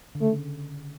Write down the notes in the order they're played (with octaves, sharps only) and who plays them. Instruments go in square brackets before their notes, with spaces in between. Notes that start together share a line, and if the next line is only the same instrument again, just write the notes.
[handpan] D3
[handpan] C#3 [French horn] A3